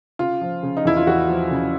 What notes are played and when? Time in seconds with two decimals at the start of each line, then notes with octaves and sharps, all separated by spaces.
0.19 C#3 F4
0.41 F3
0.63 C#3
0.77 D#4
0.85 E2 E4
0.97 F4
1.07 E2 F#4
1.28 F3
1.51 C#3